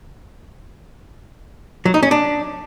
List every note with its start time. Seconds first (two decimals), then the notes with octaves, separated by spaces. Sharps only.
1.86 F#3
1.94 D#4
2.03 C#4
2.11 D4